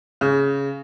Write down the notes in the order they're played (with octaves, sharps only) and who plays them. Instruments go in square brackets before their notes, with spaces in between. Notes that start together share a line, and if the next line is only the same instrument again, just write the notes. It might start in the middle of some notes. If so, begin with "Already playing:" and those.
[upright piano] C#3